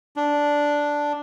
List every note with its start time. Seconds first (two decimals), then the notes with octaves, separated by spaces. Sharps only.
0.16 D4